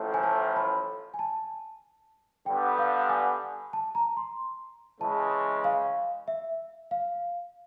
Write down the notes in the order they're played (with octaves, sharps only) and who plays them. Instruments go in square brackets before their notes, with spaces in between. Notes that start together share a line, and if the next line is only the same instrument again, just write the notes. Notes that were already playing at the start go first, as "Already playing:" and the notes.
Already playing: [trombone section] A1 A2 F3 A3
[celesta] G#5
A5
B5
G#5
A5
[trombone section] G2 D3 G3 B3 [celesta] G5
[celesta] F5
G#5
A5
A#5
C6
[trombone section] C#3 E3 G#3 [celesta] A5
[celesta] F5
E5
F5